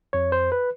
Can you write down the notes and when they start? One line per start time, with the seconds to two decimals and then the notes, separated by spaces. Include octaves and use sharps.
0.13 F2 C#5
0.32 C5
0.52 B4